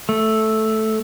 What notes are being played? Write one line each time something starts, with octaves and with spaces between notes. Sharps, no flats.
A3